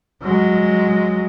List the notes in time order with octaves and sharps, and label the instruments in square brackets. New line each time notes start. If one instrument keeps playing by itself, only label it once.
[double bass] F#3 G#3